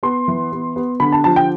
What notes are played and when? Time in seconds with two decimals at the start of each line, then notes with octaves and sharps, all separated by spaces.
0.03 B3 C6
0.28 E3
0.52 B3
0.76 B3
1.00 D3 B5
1.12 A5
1.24 F3 A5
1.36 G5